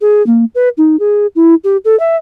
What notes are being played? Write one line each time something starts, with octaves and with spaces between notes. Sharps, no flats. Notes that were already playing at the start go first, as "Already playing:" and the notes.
G#4
A#3
B4
D#4
G#4
E4
G4
A4
E5